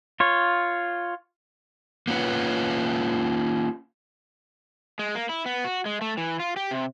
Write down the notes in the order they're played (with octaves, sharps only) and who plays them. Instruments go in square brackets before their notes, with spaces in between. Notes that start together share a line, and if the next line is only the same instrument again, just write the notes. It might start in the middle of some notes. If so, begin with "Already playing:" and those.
[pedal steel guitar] F4 C#5
[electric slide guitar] A#3 C4 C#4 F4 B4 F#5
G#3
A#3
E4
B3
F#4
G#3
A3
E3
F4
G4
C3